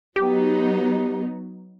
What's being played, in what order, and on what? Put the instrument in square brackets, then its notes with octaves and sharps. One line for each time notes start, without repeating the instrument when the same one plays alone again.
[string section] F#3 B3 D#4 [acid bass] G4